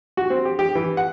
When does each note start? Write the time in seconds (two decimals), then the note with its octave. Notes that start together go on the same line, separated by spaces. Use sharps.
0.17 F#4
0.30 C4
0.45 G4
0.59 G4
0.75 E3
0.97 F#5